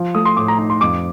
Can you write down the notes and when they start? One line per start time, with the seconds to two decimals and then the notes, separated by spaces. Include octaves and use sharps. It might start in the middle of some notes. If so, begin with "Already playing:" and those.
Already playing: F3
0.15 A3 D#6
0.25 C6
0.37 A2 D6
0.48 A#5
0.58 D#4 A#5
0.70 C6
0.81 F2 D6